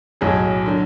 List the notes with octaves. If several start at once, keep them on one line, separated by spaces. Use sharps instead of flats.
B1 A2 F#3 G#4
D3 F#3